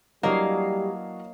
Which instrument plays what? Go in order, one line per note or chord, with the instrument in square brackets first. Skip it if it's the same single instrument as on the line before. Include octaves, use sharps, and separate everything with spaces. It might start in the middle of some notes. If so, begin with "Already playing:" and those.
[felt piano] E3 F#3 D4 [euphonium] G3 [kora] A#3 [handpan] C#5 D#5 F5